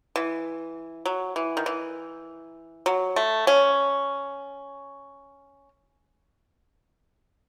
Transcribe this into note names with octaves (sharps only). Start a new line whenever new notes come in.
E3
F#3
E3
D#3
E3
F#3
A3
C#4